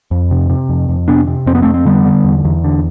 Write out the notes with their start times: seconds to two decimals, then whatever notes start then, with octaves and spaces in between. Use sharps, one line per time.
0.11 F2
0.31 C3
0.50 C3
0.69 F2
0.89 F2
1.08 C3 B3 D4
1.27 C3
1.46 F2 C4
1.55 B3
1.62 A3 C4
1.66 F2
1.74 C4
1.85 D3 G3 B3
2.05 D3
2.24 E2
2.45 E2
2.64 D3